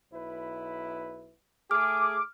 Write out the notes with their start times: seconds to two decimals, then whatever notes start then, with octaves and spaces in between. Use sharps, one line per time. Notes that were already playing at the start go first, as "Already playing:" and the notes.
0.13 B1 E4 B4
1.71 A3 G#4 D6 F6